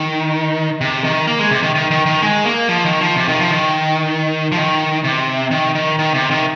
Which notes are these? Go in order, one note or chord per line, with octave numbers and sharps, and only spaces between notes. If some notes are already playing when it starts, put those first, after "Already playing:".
Already playing: D#3
C3
D#3
A#3
G#3
C3
D#3
D#3
D#3
D#3
G#3
A#3
F3
D#3
F3
C3
D#3
F3
D#3
F3
D#3
C3
D#3
D#3
D#3
C3
D#3